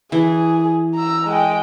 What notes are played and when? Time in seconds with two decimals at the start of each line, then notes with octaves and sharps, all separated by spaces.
0.12 E3 G#4
0.95 A#5 E6
1.28 G#3 G5